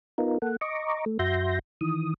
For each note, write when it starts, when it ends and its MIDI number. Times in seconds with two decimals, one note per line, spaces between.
0.18 0.38 59
0.18 0.38 63
0.18 0.38 65
0.18 0.38 70
0.42 0.56 58
0.42 0.56 69
0.42 0.56 78
0.61 1.05 75
0.61 1.05 82
0.61 1.05 85
0.61 1.05 86
1.06 1.18 57
1.19 1.59 42
1.19 1.59 66
1.19 1.59 76
1.19 1.59 84
1.19 1.59 91
1.19 1.59 94
1.81 2.14 51
1.81 2.14 52
1.81 2.14 87